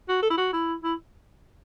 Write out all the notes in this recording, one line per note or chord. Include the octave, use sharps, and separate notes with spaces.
F#4
A4
E4
F#4
E4
E4